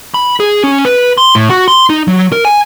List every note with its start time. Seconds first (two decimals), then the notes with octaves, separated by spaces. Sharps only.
0.14 B5
0.40 G#4
0.64 C#4
0.85 B4
1.18 C6
1.35 A2
1.50 F#4
1.68 C6
1.90 D#4
2.08 F#3
2.32 A#4
2.45 G#5